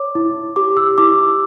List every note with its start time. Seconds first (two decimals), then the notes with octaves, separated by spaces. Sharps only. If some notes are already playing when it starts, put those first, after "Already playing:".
Already playing: C#5 D6
0.15 E4
0.56 G4 D6
0.77 E6
0.98 E4 D6